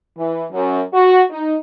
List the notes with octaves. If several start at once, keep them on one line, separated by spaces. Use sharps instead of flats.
E3
F#2
F#4
D#4